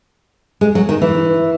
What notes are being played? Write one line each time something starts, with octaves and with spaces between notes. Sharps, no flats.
G#3
F#3
D#3
E3